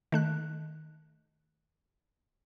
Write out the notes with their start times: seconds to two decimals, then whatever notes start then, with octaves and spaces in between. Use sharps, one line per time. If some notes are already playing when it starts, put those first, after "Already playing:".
0.12 D#3 A3 F#6